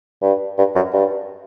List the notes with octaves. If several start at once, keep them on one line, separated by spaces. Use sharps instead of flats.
G2
G2
F#2
G2